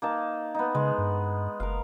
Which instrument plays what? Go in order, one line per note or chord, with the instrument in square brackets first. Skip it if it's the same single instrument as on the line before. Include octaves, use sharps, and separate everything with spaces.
[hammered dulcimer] A#3 D#4 A5
B3 D#4
[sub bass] C#3 [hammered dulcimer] G#3
[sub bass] G2
[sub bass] F#1 [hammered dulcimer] A#4 F5